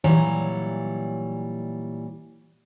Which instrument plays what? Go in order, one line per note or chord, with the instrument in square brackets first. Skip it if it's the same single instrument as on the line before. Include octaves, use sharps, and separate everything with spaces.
[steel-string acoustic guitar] A#2 E3 F#3 G3 C#5 A#5